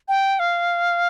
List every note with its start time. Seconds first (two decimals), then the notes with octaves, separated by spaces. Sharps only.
0.08 G5
0.39 F5